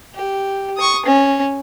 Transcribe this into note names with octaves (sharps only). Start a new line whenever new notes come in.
G4
C#6 D#6
C#4